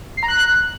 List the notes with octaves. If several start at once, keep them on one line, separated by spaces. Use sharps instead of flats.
C7
A#5
F#6